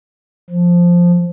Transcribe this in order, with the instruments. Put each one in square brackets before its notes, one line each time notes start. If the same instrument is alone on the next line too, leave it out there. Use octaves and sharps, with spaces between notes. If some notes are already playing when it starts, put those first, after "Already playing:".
[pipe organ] F3